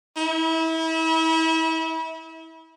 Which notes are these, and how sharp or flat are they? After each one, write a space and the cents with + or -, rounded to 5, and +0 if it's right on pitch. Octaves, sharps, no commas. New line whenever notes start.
E4 -30